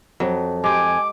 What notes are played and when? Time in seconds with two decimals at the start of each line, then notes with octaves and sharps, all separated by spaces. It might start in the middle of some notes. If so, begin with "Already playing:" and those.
0.20 F2 F#3
0.64 G#3 G4 G#5 D6